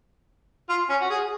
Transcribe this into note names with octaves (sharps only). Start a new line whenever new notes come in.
F4
C#4
F#4
G#4